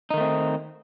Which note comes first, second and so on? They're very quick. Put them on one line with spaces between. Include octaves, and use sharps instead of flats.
D#4 D#3 A3 C4